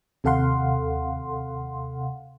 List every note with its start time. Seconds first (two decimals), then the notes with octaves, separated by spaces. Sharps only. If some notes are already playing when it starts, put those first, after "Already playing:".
0.24 D#2 C3 A4 F5 F#5 C6